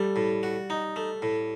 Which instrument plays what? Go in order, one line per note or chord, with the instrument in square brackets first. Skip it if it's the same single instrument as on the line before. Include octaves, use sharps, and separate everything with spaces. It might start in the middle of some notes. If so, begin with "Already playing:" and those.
Already playing: [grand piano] G3 [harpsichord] A3
[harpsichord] A2
F#4
D#4
A3
A2